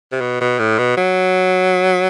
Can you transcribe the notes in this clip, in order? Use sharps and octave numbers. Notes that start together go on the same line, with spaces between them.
C3
B2
B2
A2
B2
F#3